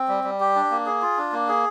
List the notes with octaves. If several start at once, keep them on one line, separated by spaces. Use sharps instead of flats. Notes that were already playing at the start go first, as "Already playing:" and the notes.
Already playing: C4
G3
G3
G4
D4
A#3
G#4
F4
D4
A#3
G#4